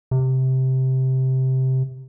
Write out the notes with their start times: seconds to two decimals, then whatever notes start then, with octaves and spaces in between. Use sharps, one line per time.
0.11 C3